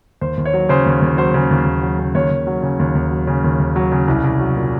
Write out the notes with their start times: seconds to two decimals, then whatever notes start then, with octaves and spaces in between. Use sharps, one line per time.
0.21 D#2 C5
0.37 D#2
0.45 C#5
0.54 F#3
0.69 C#3 C5
0.86 D#2
1.02 D#2
1.18 F#3 C5
1.34 C#3
1.51 D#2
1.66 D#2
1.82 F#3
1.99 C#3
2.15 D#2 C#5
2.31 D#2
2.47 F#3
2.63 C#3
2.79 D#2
2.95 D#2
3.11 F#3
3.27 C#3
3.44 D#2
3.60 D#2
3.76 F#3
3.92 C#3
4.08 C2
4.24 C2
4.40 F#3
4.56 A#2